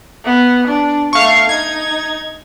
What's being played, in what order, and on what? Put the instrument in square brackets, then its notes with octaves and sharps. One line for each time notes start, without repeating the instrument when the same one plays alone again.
[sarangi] B3
D4
[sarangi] A3 [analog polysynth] F5 C#6
[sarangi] D#4 [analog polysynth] G#6